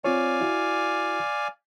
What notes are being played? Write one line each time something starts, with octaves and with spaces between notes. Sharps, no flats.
C4 F4 C#5 D5 F5 G#5
E4 F#4